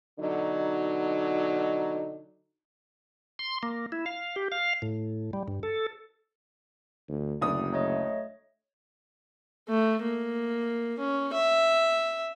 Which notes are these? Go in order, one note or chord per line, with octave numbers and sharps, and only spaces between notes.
B2 D3 F#3 D#4
C6
A#3
E4
F5
G4
F5
A2
G3
G2
A4
D2
F#1 D2 D4 D#6
A3 C#5 D#5
A3
A#3
C#4
E5